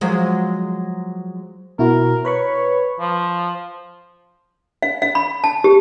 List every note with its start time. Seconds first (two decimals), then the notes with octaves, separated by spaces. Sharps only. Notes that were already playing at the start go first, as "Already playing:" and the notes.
0.01 F3 F#3 G#3
1.79 B2 E4 F#4 A#4
2.25 B4 C#5 B5 C#6
3.00 F3
4.83 F5
5.02 F5
5.15 B5
5.44 A5
5.64 G4